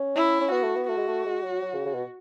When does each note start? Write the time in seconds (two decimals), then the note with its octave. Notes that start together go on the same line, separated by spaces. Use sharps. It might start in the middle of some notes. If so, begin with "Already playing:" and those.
Already playing: C#4
0.15 E4
0.41 C#4
0.52 B3 F#4
0.64 A3
0.76 B3
0.89 A3 F#4
0.98 G#3
1.08 A3
1.26 G#3
1.43 F#3
1.62 F#3
1.75 C#3
1.86 C#3
1.95 B2